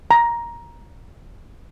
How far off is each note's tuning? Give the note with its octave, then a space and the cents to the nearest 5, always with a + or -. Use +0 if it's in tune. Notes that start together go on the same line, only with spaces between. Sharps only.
A#5 +15